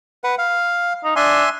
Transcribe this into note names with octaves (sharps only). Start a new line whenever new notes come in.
B4 F#5
F5
D#4
D4 E5 G#5 C6